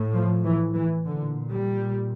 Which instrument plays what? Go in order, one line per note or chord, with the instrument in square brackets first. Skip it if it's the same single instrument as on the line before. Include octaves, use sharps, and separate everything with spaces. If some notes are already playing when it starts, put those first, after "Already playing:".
Already playing: [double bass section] A2
F3
E3
E3
A#2 D3
G3